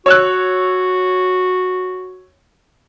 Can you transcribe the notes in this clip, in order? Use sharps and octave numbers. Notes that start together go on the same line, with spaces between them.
F#4 C#5 E6 F#6